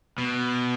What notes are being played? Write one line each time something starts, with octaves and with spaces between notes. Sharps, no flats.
B2